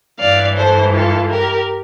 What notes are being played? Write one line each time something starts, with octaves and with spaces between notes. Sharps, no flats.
G2 E3 D5 F5
A4 C5
F4 A4
G4 A#4